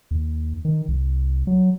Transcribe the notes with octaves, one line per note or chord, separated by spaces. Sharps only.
D#2
D#3
C2
F#3